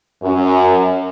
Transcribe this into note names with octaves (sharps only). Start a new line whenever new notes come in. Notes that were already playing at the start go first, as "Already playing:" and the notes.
F#2